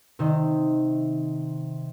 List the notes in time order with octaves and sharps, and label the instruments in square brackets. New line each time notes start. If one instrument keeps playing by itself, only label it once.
[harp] C3 D#3